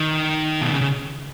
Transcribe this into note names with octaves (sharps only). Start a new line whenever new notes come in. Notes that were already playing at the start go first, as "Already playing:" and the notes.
Already playing: D#3
B2
C#3
C#3